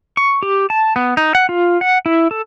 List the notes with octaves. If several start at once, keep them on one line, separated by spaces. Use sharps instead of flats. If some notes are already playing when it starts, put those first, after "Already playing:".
C#6
G4
A5
B3
D#4
F#5
F4
F#5
E4
A4